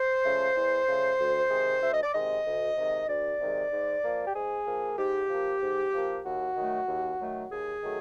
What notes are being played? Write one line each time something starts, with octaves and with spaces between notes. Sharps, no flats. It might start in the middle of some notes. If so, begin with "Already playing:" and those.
Already playing: C5
C#3 F3 A3
E2
C#3 F3 A3
D2
C3 D#3 G#3
D2 E5
D#5
D5
C3 D#3 G#3 D#5
D2
C3 D#3 G#3
D2 D5
C3 D#3 G#3
G#2
F3 A#3
G4
G#2 G#4
F3 A#3
G#2 G4
F3 A#3
G#2
F3
A#3
D#2 F#4
D#3 F#3 A3
D#2
D#3 F#3 A3
D#2 G#4
D#3 F#3 A3